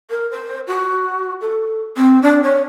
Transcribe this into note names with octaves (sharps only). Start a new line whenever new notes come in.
A#4
C5
F#4
A4
C4
D4
C#5